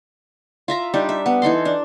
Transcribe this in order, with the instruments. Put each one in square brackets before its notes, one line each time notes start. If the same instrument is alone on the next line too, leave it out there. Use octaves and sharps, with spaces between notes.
[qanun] F4 E5 A#5
G3 D4 D#4
E5
B3
E3 D#4 A4 C6
D4